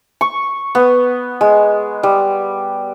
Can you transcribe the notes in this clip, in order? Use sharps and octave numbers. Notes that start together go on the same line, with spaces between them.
C#6
B3
G#3
G3